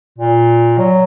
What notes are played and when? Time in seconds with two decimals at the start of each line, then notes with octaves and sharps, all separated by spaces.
0.18 A#2
0.78 F#3